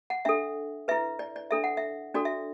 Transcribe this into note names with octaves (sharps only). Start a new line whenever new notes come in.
F#5
D4 A4 E5
E4 B4 E5
D5
D5
D4 A4 E5
F#5
E5
D4 F#4 A4 D5
E5